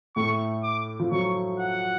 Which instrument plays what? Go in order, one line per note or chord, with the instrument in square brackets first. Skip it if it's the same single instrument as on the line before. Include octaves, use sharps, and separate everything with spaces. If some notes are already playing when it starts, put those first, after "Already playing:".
[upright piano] A2 A3 [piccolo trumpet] C#6
[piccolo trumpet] D6
[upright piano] F3
[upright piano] F#3 [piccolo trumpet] C#6
[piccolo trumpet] F#5